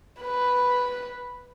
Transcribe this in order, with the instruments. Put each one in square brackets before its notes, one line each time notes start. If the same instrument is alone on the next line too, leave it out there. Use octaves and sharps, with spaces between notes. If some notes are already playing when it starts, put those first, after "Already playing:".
[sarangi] B4